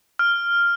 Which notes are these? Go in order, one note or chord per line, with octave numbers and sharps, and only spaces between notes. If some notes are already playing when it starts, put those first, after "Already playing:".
F6